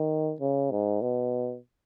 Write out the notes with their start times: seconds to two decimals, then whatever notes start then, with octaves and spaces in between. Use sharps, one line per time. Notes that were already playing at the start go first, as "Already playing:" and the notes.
Already playing: D#3
0.40 C#3
0.71 G#2
1.02 B2